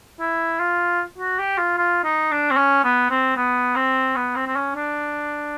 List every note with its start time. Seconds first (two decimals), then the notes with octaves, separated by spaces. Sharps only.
0.20 E4
0.59 F4
1.18 F#4
1.39 G4
1.58 F4
1.78 F4
2.04 D#4
2.31 D4
2.51 C4
2.57 C#4
2.84 B3
3.10 C4
3.37 B3
3.76 C4
4.16 B3
4.36 C4
4.47 C4
4.56 C#4
4.75 D4